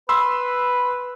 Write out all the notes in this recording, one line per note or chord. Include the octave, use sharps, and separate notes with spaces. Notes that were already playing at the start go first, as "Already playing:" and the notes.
B4 B5 C6 E6